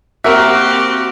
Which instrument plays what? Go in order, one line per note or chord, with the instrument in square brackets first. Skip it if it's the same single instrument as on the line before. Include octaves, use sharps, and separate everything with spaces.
[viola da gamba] A#3 C4 G4 [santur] F#4 C#6 [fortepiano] A#4 E5